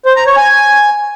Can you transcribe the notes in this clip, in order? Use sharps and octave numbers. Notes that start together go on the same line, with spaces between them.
C5
A#5
C#5
G#5